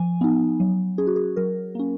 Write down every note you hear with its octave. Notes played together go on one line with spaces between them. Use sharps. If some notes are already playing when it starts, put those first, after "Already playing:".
Already playing: F3 G#5
B3 D#4
F#3
C#4 G#4
F#4
G#4
F#3 A#4
A#3 C#4